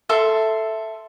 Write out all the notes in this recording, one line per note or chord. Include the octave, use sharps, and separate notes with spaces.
A4 E5 C6